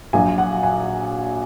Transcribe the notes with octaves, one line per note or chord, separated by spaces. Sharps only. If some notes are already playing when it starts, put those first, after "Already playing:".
A#1 A#2 F#3 G#5
F#5
G#5